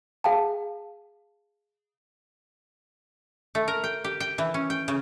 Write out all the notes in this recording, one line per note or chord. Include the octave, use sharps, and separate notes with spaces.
G#4 F5 G5 A5
A3
A#4
G5
G4
G5
E3
C#4
G5
C#3